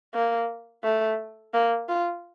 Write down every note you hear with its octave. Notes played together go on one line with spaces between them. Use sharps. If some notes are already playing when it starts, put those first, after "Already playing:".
A#3
A3
A#3
F4